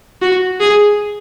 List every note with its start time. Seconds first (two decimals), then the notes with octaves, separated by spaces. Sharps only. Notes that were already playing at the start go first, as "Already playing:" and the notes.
0.22 F#4
0.60 G#4